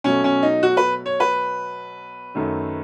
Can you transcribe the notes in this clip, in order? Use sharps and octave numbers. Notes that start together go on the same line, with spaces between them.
B2 F#3 A3 C#4
C#4
D#4
F#4
B4
C#5
B4
F#2 D#3 A3